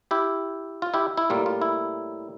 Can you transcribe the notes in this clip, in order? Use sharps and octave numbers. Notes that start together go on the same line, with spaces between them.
E4 G4
F4
E4 G4
E4
A2 G3 A#3 F4
F4
E4